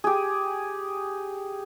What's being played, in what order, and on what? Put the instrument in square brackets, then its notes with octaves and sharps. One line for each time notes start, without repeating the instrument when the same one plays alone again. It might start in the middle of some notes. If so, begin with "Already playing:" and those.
[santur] G4 G#4